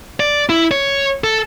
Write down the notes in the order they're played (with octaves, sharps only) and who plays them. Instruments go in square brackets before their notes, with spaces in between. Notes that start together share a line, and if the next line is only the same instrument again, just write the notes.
[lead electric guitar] D5
E4
C#5
A4